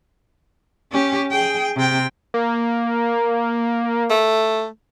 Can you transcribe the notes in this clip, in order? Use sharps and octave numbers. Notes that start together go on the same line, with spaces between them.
C#4 G4
G#4 G5
C3 G5
A#3
A3